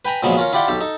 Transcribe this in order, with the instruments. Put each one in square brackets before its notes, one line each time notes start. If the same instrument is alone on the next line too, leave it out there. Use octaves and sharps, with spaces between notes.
[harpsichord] B4 G5 G#5 A#5 B5
A#2 C#3 F3 F#3 G#3 B3
C#4 F4 A#4 C#5
E4 F4 G4 D5 F#5 C6
B1 G4 A4
D#4 A4